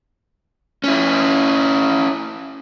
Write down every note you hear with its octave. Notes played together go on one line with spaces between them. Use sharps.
C#4 E4